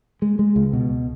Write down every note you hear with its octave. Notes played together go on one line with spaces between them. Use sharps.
G#3
G#3
C#2
B2